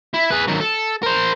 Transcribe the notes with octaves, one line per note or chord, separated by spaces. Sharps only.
E4
G#4 B4
D#3 F#3
A4
A#4 C5